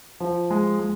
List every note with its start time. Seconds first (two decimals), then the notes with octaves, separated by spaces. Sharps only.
0.20 F3
0.50 G#3
0.80 G#3